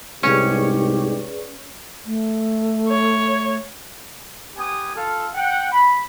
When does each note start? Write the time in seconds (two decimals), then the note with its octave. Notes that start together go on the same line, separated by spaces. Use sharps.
0.23 C2 G#2 C#4 G4 G#4 B4 D5
2.06 A3
2.89 C#5
4.56 B3 G4 G#5 D#6
4.95 F4 A4 F5
5.34 F#5 G5
5.71 B5